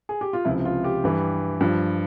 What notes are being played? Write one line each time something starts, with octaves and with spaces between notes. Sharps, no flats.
G#4
G4
F4
C#2 C3 F3 E4
F4
G4
G2 E3
G2 F3